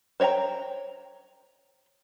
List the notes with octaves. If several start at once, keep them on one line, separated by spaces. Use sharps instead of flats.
C5 C#5 D#5 G5 A#5